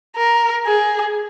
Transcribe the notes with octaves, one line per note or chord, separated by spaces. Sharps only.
A#4
G#4